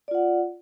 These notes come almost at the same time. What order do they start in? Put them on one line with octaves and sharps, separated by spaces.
D5 F4 F#5